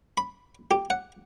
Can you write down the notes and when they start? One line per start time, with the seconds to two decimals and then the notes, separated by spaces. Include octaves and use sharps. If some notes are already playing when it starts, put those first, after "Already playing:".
0.18 B5
0.71 G4
0.90 F#5